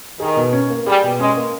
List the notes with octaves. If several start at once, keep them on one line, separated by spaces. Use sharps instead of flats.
D#3 G#4
B2
C#4
A#3
G3 G#4
B2
G#3 C#4
A#3